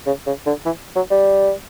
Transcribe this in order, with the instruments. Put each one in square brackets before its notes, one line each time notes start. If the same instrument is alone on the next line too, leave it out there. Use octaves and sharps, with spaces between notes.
[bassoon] C#3
C#3
D3
E3
F#3
G3